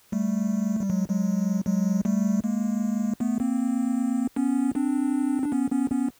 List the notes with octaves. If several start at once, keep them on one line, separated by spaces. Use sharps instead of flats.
G3 A3
G3
F#3 G#3
F#3 G#3
F#3 G#3
G3 A3
G#3 A#3
A3 B3
A#3 C4
B3 C#4
C4 D4
D4
B3 C#4
B3 C#4
B3 C#4